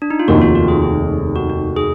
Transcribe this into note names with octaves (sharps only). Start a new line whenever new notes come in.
D4
D#4
F4
F1 D#2 D#3 F#4
F4
F#4
G#4
G#4
F#4
F#4
G#4